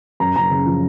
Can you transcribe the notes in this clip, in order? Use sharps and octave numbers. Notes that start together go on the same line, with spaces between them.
F#2 A#5
F#1 A#5
C#3
F3